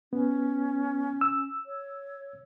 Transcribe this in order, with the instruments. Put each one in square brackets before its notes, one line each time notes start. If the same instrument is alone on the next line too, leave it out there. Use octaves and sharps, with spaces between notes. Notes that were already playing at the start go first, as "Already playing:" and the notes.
[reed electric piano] B3 [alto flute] C#4
[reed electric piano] E6
[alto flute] C#5